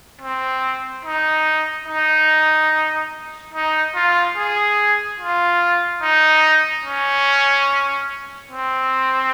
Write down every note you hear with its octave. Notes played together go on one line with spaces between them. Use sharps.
C4
D#4
D#4
D#4
F4
G#4
F4
D#4
C#4
C4